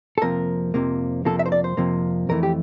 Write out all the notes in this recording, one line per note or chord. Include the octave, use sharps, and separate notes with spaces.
A4
F2 C3 F3 A#3 A#4
F2 C3 F3 A#3
F2 C3 F3 A#3 A4
E5
C5
D5
C5
F2 C3 F3 A#3
F2 E3 A3 A#4
G4